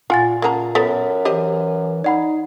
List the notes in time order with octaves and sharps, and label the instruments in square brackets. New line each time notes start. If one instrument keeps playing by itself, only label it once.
[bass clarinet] A#2 [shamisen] F4 [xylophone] F#5 G#5 A6
[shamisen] C#3 A#3 A#5 [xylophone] A#4 F#5 A5
[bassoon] F#2 [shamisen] B3 A4 [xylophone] B6
[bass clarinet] E3 [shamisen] G4 C5 D#5
[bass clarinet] D#4 [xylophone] D5 F#5 B5